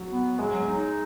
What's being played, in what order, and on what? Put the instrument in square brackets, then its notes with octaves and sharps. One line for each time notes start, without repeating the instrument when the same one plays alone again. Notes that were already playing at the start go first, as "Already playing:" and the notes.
Already playing: [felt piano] F#3
[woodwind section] B3
[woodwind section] F#3 [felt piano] G#3
[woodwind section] D#4